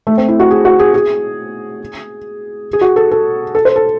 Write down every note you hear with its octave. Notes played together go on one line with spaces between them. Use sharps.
A3
C4
E4
F#4
G#4
F#4
G#4
G#4
G#4
F#4
A4
A4
A4
C5
A4